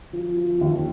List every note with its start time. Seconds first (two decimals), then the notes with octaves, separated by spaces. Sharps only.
0.13 F3
0.37 F3
0.61 D#2